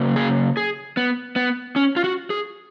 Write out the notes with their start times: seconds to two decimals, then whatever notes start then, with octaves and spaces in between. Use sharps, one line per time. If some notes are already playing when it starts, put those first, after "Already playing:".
Already playing: C#3 F#3 A#3
0.16 G#4
0.57 G#4
0.97 B3
1.36 B3
1.76 C#4
1.96 F4
2.04 F#4
2.30 G#4